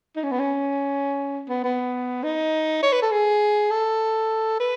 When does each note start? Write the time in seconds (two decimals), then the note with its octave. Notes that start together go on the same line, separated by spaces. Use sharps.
0.16 D#4
0.23 C#4
0.31 B3
0.39 C#4
1.49 B3
1.64 B3
2.23 D#4
2.82 C#5
2.92 B4
3.02 A4
3.12 G#4
3.71 A4
4.60 B4